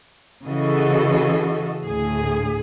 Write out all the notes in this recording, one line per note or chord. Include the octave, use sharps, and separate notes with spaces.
C#3 E3 F#4 G#4 A4 D#5
D2 A2 G#4